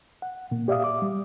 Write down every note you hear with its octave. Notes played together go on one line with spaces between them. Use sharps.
F#5
A#2 A#3
G4 D5 E5 F5 D#6
D6
G3